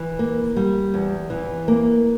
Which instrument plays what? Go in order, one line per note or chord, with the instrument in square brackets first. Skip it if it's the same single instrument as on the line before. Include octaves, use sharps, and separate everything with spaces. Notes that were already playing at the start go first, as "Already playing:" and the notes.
Already playing: [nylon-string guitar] E3
A#3
G3
E2
E3
A#3